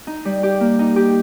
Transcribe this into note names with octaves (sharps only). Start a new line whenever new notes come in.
D#4
G3
G4
A#3
D#4
G4